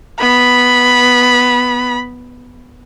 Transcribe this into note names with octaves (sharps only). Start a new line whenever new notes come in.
B3 B5